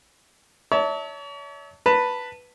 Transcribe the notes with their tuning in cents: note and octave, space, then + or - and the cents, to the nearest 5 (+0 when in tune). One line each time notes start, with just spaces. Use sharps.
C#5 +40 E5 -40 A5 +20
B4 +0 A5 +20